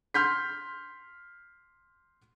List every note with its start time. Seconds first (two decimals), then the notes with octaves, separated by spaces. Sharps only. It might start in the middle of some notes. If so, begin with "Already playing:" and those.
0.14 C6 F6 G6 B6